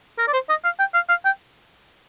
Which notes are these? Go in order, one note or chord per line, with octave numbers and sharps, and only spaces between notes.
A#4
D5
C5
D#5
F5
G5
F5
F5
G5